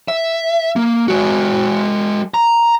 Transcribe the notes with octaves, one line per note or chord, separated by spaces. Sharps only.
E5
A#3
G#3 F#4
A#5